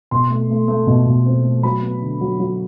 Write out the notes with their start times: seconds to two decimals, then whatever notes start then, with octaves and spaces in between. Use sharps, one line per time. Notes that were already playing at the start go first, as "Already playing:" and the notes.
0.11 B2 C6
0.30 A3
0.50 A3
0.68 A3
0.87 B2
1.06 B2
1.26 C4
1.45 A3
1.63 F#3 B5
1.82 B3
2.02 D3
2.21 F#3
2.40 F#3